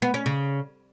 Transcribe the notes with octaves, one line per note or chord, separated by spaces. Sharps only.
B3
C#4
C#3